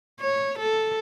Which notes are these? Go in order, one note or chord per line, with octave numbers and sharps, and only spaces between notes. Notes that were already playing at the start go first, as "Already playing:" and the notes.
C#5
A4